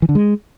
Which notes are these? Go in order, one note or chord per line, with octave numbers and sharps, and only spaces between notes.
E3
D3
G#3